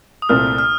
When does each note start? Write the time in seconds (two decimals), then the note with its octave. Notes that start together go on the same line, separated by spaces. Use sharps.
0.22 D#6
0.29 C2 A#2 A3 C4 F6
0.58 F6